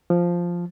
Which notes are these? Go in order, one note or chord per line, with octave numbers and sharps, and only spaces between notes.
F3